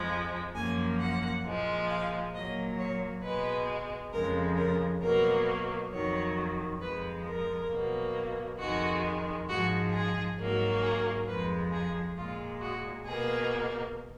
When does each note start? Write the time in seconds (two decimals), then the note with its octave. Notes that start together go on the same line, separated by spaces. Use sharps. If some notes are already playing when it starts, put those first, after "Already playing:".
Already playing: F2 F3 G#3
0.54 F#2 F3 A#3 G#5
0.99 F#5
1.44 A#2 F3 G#3
1.89 F5
2.33 A#2 F#3 A#3 D#5
2.79 C#5
3.23 B2 G#3 B4
4.13 F2 C#3 F3 G#3 A#4
4.57 A#4
5.02 B2 F#3 A#3 A#4
5.91 F2 D#3 F#3 C#5
6.81 F2 F3 G#3 B4
7.26 A#4
7.70 B2 F#3 A#3
8.60 F2 D#3 G#3 F#4
9.49 G#2 F3 G#3 F#4
9.93 G#4
10.38 G#2 F#3 A#3
10.83 G#4
11.27 F2 F3 G#3 B4
11.72 G#4
12.17 A#2 G#3 F4
12.61 F#4
13.06 B2 A#3 G#4